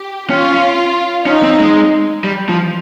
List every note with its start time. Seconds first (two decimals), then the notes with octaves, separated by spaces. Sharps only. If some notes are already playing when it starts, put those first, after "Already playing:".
Already playing: G4
0.29 C#4 F4
1.26 C#4 D#4
1.43 C4
1.60 G#3
2.24 G3
2.49 F3